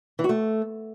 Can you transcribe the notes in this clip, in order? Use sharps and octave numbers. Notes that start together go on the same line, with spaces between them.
E3
F#4
A3